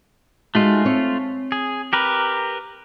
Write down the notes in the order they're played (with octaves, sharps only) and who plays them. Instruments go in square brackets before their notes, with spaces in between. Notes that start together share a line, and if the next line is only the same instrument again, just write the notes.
[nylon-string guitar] G#3 D#4 F#4 [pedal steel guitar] A3 F4
[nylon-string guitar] C4 C#5
[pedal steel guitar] G#4
G4 A#4 B4